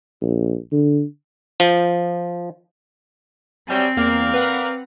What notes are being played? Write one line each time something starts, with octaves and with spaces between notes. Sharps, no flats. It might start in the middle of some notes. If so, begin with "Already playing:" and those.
A#1
D3
F3
C3 F#3 G3 C4 G5 G#5
E2 A#3 A#4 D5 F5
B4 F#5 A#5